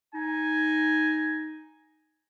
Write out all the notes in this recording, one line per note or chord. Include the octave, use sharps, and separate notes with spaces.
D#4 G#5